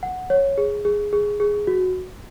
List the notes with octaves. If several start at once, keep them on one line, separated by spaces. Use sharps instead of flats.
F#5
C#5
G#4
G#4
G#4
G#4
F#4